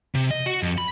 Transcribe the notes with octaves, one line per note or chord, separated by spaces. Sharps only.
C3
D#5
F#4
F2
B5